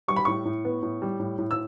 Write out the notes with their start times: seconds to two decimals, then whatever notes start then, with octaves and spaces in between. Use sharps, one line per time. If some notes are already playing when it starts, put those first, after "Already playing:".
0.08 G3 C#6
0.16 B5
0.25 A2 C#6
0.45 A2
0.65 B3
0.83 A2
1.02 G3
1.20 A2
1.38 A2
1.51 E6